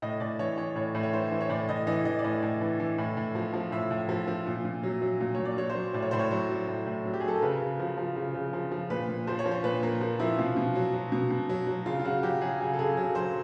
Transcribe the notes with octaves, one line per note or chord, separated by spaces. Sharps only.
A2 D#5
A2 D5
E3 C#5
E3 C#5
A2 C#5
A2
C#5
E3 C5
E3
C#5
A2 D5
A2 D#5
E3 D#5
E3 D#5
D5
A2 D#5
A2
E3
E3
A2
A2
F3
F3
A2 E5
A2
F3
F3
A#2
A#2
F#3
F#3
A#2
A#2 C#5
D5
F#3 C#5
C5
F#3
A2 D5
C#5
A2 C5
C#5
F#3 C5
F#3
A2
A2
F#3
G4
G#4
F#3 A4
A#4
C#3 B4
C#3
F3
F3
C#3
C#3
F3
F3
A#2 B4
A#2
F3 C5
C#5
F3
C5
A#2 B4
A#2 A#4
F3
F3 E4
B2 F4
B2
F#3
F#3
B2
B2
F#3
F#3
C#3 F4
F4
C#3 F#4
F#3 G4
F#3 G#4
C#3 G#4
A4
C#3 G#4
F#3 A4
F#3 C5